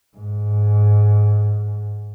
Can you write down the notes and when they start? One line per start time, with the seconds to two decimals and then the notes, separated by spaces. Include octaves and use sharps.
0.18 G#2